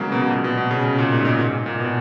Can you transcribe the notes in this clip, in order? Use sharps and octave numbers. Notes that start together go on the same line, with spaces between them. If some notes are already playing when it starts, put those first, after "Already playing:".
Already playing: C#3 E3 F#3 G#3 A#3
B2
B2
A#2
B2
B2
C#3
C#3
A#2
G#2
A#2
G#2
A#2
B2